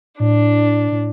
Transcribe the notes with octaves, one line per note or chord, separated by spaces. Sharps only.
A2 D4
A2